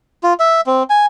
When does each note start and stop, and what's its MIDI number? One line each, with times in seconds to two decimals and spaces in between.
0.23 0.34 65
0.40 0.61 76
0.66 0.83 60
0.90 1.06 80